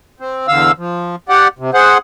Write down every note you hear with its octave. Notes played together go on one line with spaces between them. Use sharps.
C4
E2 D3 F5 E6
F3
G4 D5 F#5
C3
G#4 C5 F#5